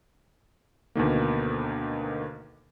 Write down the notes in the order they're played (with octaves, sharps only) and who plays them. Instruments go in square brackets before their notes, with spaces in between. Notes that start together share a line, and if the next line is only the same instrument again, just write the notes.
[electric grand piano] D2 B2 D#3 A#3